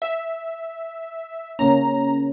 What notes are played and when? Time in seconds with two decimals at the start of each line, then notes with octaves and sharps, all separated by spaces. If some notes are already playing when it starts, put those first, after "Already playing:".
0.02 E5
1.59 C#3 A#3 C#4 A#5